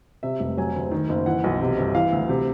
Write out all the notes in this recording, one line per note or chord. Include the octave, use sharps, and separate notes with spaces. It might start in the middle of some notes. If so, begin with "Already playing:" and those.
C3 E5
F1
F#3 G#5
D2
D#3
F#1
E3 F#5
B1
C3
G1
E3 F5
D2
C3